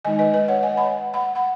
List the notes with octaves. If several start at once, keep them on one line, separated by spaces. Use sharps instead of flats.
D#3 G#3 D#4 D#5 G#5
B4 D#5
B4 D#5
C#5 F#5
D#5 G#5
F#5 B5
F#5 B5
F#5 B5